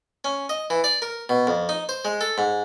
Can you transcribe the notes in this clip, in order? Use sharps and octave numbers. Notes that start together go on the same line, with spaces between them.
C#4
D#5
E3
D5
A#4
B2
F2
D#4
C5
G#3
A4
G#2